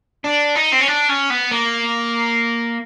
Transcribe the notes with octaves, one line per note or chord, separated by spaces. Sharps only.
D4
D#4
C4
C#4
D4
C#4
B3
A#3